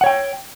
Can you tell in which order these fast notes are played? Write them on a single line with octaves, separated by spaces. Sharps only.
F#5 C#5 G5